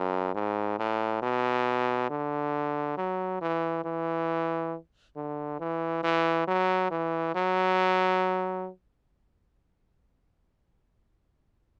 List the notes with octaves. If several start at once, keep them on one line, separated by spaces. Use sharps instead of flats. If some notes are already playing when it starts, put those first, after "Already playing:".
Already playing: F#2
G#2
A2
B2
D3
F#3
E3
E3
D3
E3
E3
F#3
E3
F#3